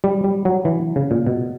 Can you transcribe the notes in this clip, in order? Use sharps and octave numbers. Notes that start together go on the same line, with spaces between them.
G3
G3
F#3
E3
C#3
A#2
B2